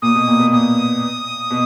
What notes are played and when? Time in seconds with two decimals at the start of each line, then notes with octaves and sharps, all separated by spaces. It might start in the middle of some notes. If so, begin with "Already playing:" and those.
0.02 A#2 D#6
0.15 B2
0.27 A#2
0.39 B2
0.52 A#2 D#6
1.51 B2